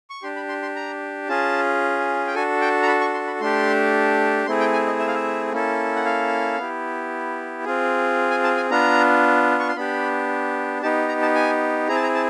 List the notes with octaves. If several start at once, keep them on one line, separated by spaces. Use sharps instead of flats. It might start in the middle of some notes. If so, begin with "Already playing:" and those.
C#6
D4 G4 C6
B5
C6
C6
A#5
C#4 F4 G#4 A5
G5
D4 F#4 A4 G#5
G5
A#5
B5
C#6
C6
B5
A3 D4 G4 C6
A3 C4 E4 G#4 C6
G5
G#5
D#5
E5
F5
E5
A#3 C#4 E4 A4
F#5
F5
B3 E4 G4
C4 F4 G#4
G#5
A5
G#5
B3 D4 F4 A#5
C#6
C6
B3 D4 G4 B5
B3 D#4 G4 A5
A#5
A5
G#5
C4 E4 G#4 A#5
A5
A#5
A5